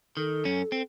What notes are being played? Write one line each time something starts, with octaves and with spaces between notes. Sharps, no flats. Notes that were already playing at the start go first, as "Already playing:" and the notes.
D#3 A4
F#2 C#4
C4